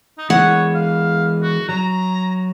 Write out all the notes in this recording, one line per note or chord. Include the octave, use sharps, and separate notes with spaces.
D#4
E3 G#3 C#5 F#5
F5
F#4
F#3 A#5